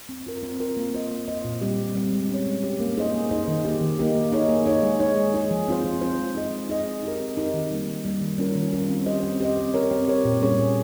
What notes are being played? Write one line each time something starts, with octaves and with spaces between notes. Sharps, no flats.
C4
F4 A#4
C4
F4 A#4
A#3
F4 C5 D#5
A#3
F4 C5 D#5
A#2
G3 C4 G4
A#2
G3 C4 G4
G#3
C#4 G4 C#5
G#3
C#4 G4 C#5
A#3
D#4 G#4 C5 D#5
A#3
D#4 G#4 C5 D#5
D#3
A#3 D#4 G4
D#3
A#3 D#4 G4
A#3
D#4 G#4 C#5
A#3
D#4 G#4 C#5
G#3
D#4 G#4 C#5
G#3
D#4 G#4 C#5
F3
C4 F4 C5
F3
C4 F4 C5
G#3
D#4 G#4 D#5
G#3
D#4 G#4 D#5
C4
D#4 G4 A#4
C4
D#4 G4 A#4
D#3
G3 A#3
D#3
G3 A#3
D#3
G3 C#4 F4 A#4
D#3
G3 C#4 F4 A#4
C4
G4 C5 D#5
C4
G4 C5 D#5
C4
G4 A#4 C#5
C4
G4 A#4 C#5
A#2
G3 C#4 G#4 C#5
A#2